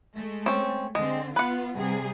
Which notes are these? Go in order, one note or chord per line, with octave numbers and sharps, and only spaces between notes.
G#3 A3
C4 C#4
D3 G#3 C4
B3 F4 B4 F#5
C3 G3 G#4